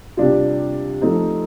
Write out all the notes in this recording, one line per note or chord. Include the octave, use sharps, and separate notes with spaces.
C3 G3 D4 F4
F3 A3 C4 D#4